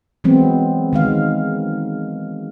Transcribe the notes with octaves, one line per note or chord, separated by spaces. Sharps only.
E3 F#3 G#3 B3 C4
D#3 G#3 F5